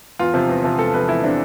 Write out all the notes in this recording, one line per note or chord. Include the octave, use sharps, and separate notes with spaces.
E2 F4
C3 F3
E2
C3 F3
E2 A4
C3 F3 B4
E2 E4
C3 F3 D4